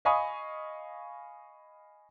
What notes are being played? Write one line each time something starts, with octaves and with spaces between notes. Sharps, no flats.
D#5 F5 G#5 B5 C#6 D#6